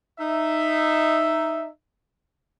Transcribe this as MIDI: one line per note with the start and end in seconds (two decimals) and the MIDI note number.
0.19 1.67 63
0.19 1.67 76